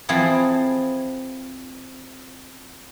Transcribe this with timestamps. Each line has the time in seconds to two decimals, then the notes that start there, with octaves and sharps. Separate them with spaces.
0.09 E3 F3 C4 E4 G#4 A4